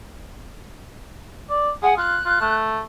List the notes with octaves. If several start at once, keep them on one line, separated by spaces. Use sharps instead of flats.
D5
G#4 F#5
F4 F#6
F4
A3